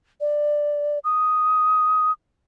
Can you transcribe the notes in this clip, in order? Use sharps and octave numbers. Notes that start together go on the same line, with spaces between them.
D5
D#6